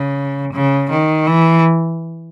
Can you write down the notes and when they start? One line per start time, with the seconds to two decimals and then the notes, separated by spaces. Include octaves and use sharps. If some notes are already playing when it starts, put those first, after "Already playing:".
Already playing: C#3
0.53 C#3
0.91 D#3
1.27 E3